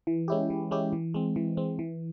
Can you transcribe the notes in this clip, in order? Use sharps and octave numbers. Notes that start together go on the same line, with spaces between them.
E3
G#3 C#4 E4 G4
E3
G#3 C#4 E4 G4
E3
G#3 C4
E3
G#3 C4
E3